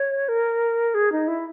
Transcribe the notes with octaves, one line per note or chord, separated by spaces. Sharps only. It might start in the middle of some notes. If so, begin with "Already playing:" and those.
Already playing: C#5
A#4
G#4
D#4
E4